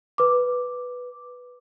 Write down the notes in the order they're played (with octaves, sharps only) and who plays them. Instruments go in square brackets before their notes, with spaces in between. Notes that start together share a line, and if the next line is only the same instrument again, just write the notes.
[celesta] B4 D6